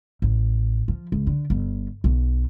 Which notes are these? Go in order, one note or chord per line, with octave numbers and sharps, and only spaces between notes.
A1
F3
C#2
D3
G1
B1